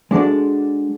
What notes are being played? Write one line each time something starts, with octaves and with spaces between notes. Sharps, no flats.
G#3 D4 F#4 A4 D5